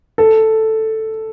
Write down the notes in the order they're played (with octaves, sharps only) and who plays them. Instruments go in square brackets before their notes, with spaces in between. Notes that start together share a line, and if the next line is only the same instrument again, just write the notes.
[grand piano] A4